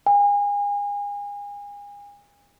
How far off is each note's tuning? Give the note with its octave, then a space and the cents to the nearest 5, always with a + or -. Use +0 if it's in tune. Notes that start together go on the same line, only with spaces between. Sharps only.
G#5 -35